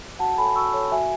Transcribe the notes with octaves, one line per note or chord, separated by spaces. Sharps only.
F#4 F#5 A5
A4 C#5 G#5 B5
F#4 C#6 E6
A4 C#5
F#4 E5 G#5